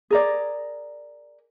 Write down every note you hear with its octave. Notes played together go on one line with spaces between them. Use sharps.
G#4 A#4 D5